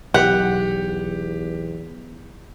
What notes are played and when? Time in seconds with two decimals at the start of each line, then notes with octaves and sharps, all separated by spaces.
0.14 B1 E2 G4 F#5